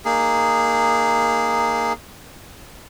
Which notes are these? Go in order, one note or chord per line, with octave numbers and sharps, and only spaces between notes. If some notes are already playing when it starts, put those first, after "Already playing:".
A#3 D#4 G#4